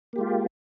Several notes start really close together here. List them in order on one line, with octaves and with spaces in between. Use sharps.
A#3 G4 G#3 F4